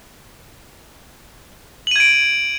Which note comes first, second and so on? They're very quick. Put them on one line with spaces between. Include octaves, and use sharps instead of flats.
F#7 D#7 G#6 D7